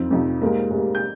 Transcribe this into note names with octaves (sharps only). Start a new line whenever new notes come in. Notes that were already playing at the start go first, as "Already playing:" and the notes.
Already playing: F2 F3 C4 D#4
F2 C3 F3 C4 D#4
G#2 G3 A#3
G#2 G3 A#3
G6